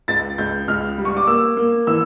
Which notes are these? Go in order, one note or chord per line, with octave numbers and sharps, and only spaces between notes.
C#2 A6
C#2 G6
C#2 F6
G3
C#6
D6
A#3 E6
A#3
E3 E6